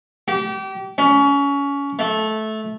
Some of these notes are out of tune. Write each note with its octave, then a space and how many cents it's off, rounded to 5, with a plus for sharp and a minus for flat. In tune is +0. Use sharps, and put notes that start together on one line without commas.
G4 -30
C#4 +25
A3 -15